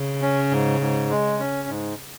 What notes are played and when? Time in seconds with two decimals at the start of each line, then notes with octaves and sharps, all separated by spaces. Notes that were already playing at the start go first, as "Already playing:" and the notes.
Already playing: C#3
0.22 C#4
0.51 G#2
0.81 G#2
1.10 G#3
1.39 C#4
1.68 G#2